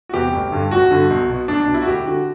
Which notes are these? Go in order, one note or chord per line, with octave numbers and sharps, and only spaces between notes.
F#4
E2 C3 E3 G4
A1
G2 D3
A1 F#4
G2 D3
B1
B2
B1 D4
D4
B2
E4
F#4
D2 G4
D3 F#4